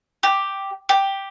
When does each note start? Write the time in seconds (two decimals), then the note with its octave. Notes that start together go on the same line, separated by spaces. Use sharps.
0.23 G4
0.89 G4